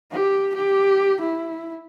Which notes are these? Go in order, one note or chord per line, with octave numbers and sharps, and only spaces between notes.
G4
G4
E4